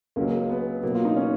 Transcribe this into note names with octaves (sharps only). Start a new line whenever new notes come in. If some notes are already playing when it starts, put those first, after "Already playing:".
C#2 C#3 F#3 A#3
B3
B2 F#3 A#3
F4
D#4
C#4